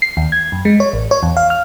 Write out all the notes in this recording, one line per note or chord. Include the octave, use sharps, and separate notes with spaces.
C7
D#2
G#6
F#2
G#3
C#5
A1
C#5
E2
F5
F6